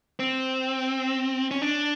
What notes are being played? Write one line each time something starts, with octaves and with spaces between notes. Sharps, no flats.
C4
C#4
D4